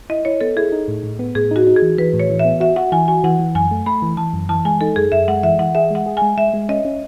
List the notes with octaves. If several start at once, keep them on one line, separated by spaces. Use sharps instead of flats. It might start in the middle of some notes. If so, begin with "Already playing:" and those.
E4 D#5
E4 C#5
B3 A4
E4 G#4
D#4
A2
A2
B3
A2 G#4
D#4 F#4
D#4
G#4
E3
E3 B4
A2
C#5
E3
E5
B3
F#4 E5
F#4 F#5
E3 G#5
F#4 G#5
E3 F#5
E3
F#2 G#5
A3
A3 B5
E3
E3 A5
F#2
E3 A5
G#3 G#5
D#4 A4
F#2 G#4
F#2 E5
G#3 F#5
E3 E5
E3 F#5
G#4 E5
G#3 F#5
G#4
G#3 G#5
G#3 E5
G#3
C#4 D#5
C#4